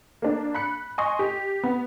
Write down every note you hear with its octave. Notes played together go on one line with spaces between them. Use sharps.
A#3 D4
B5 F#6 C#7
D#5 G#5 C6 C#6 D#6
G4
B3